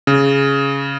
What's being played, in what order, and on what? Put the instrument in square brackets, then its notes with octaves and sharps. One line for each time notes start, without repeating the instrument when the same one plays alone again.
[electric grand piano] C#3